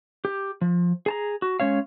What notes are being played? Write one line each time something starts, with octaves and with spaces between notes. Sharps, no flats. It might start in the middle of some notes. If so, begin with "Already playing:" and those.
G4
F3
G#4 A5 A#5
F#4
G#3 C#4 C#5 F5